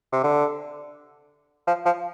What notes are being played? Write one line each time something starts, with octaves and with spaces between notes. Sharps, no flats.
C3
D3
F3
F3